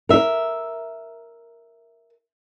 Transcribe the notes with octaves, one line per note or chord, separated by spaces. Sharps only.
A#4 E5